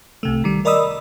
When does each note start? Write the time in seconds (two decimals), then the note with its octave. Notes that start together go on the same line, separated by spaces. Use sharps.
0.23 C2 C3 A3
0.44 D#3 G3
0.65 A#4 D5 D#5 B5 D#6 E6